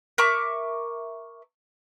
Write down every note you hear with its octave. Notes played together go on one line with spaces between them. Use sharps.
A#4 E5 C#6 D6